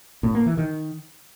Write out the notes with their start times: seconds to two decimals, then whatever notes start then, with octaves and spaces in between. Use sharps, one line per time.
0.23 A2
0.35 A#3
0.46 E3
0.57 D#3